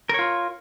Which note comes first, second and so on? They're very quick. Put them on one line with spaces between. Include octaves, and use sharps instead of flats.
A#4 C#5 F4